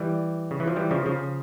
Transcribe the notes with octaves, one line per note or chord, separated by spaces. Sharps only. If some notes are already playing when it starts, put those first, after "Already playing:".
Already playing: E3 G3
C#3
E3
F3
E3 G3
C#3 F3
C#3 F3